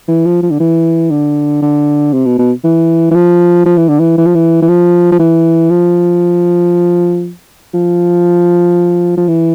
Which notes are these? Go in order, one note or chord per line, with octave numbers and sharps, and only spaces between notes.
E3
F3
F3
D3
E3
D3
D3
C3
B2
B2
E3
E3
F3
F3
E3
D3
E3
E3
F3
E3
E3
F3
F3
E3
F3
F3
F3
E3